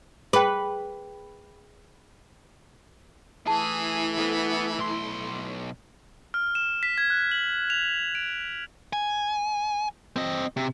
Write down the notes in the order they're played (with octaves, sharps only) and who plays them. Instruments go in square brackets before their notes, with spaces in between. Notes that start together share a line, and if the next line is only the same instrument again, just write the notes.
[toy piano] G#4 G5 [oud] B4
[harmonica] E3 [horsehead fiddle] A3 E4 [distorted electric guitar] G#4 [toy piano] A5
[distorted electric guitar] B3 [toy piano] A4 C5
[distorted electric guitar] B1 C6
[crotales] F6
E7
B6
G#6
F#6
F#7
F7
D7
[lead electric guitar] G#5
C4 D#5
C3